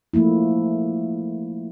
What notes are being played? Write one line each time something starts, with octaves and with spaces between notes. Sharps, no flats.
F3 A3 A#3 E4